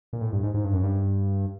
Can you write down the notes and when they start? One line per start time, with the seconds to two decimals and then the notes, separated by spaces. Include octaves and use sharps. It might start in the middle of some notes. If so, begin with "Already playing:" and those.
0.13 A#2
0.21 A2
0.32 G2
0.43 G#2
0.54 G#2
0.64 G2
0.73 F#2
0.83 G2